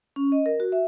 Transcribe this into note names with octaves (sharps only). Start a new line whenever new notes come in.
C#4
D#5
A#4
F#4
E5